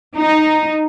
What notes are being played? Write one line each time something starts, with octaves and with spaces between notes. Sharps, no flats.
D#4